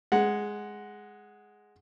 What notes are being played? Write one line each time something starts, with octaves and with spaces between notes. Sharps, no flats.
G#3 F#5